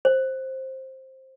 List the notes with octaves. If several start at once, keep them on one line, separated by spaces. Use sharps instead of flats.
C5